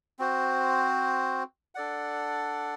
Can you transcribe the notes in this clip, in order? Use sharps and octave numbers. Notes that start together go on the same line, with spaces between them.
C4 F#4 C5
D4 A4 D5 F#5